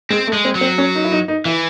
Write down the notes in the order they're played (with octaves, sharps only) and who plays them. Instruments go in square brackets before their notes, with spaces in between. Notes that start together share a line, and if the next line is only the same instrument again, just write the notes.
[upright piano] G#3 [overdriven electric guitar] C4
[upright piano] A3
[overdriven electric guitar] G#3
[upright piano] C4
[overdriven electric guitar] F#3
[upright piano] C4
C#4
D#4
E4
D#4
D#4
[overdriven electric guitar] E3 [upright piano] E4